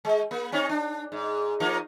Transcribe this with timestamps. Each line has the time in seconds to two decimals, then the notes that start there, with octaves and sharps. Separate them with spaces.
0.05 G#3
0.31 A#3
0.52 C4 C#4 D#4
0.69 D4
1.12 G#2
1.60 F3 A#3 D#4